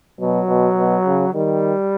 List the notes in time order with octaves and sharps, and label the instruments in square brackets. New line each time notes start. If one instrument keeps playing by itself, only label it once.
[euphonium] B2 [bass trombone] F#3
[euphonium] B2
B2
C#3
[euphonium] D#3 [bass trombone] G3